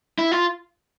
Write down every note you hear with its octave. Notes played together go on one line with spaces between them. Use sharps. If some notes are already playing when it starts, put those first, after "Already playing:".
E4
F4